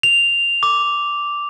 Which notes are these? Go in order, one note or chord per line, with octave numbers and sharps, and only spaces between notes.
F7
D6